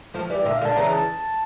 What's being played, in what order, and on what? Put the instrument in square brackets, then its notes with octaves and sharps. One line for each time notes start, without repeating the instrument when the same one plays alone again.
[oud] F3 A3
[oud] E3 G3 [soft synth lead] D5
[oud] A#2 D3 [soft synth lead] E5
[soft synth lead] F5
[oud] A#2 D3
[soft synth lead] A5
[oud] C#3 E3 [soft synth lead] A#5
[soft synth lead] A5